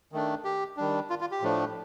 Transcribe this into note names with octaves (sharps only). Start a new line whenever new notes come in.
D#3 A3 D4
G4
D#3 G3 D4
F4
F4
G4
A2 F3 A3 D4